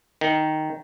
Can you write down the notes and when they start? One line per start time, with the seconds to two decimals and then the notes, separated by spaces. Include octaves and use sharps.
0.21 D#3